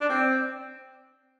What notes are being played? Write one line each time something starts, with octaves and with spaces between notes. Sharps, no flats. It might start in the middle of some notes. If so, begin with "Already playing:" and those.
D4
C4